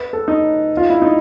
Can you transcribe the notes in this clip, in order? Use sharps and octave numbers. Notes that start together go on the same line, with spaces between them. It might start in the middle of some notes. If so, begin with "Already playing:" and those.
Already playing: B4
A4
D#4
F4
E4
D#4